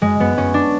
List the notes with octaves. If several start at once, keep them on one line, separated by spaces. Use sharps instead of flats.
F#2 G#3
F#2 B3
F#2 C#4
D4